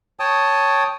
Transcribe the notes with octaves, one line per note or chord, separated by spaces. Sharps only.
C#5 G5 A5 D#6